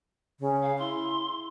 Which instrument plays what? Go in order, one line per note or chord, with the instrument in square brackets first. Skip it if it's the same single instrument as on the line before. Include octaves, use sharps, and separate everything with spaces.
[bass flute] C#3
[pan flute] F5
[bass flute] E4 [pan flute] C6